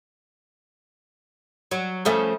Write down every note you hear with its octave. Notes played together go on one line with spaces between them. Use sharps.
F#3
C#3 F3 A3